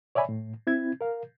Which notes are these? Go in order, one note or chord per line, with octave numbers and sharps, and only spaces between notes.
C#5 D5 E5 G#5 B5
A2
C4 E4 G#6
A#4 F5